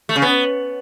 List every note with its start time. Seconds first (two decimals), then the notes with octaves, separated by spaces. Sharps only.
0.09 A3
0.16 C#3
0.22 B3